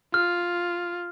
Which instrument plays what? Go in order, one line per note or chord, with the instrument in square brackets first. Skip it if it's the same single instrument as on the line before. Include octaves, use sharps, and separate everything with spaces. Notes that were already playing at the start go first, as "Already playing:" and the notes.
[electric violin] F4 [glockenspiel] F6